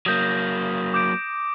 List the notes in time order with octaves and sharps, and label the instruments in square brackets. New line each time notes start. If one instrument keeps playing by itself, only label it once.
[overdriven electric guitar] F#3 A#3 [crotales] D#6 G6 A#6
[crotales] D6 G6 D7